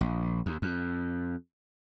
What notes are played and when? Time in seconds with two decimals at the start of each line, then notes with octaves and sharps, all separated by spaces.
0.01 A#1
0.46 D#2
0.62 F2